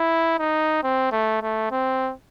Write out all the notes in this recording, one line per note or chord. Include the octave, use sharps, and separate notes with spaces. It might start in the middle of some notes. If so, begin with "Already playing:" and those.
Already playing: E4
D#4
C4
A3
A3
C4